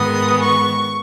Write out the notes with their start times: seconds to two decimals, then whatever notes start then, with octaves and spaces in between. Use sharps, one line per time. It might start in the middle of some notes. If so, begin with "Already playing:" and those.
Already playing: G#2 D#3 G#3 B3 D#6
0.42 C#6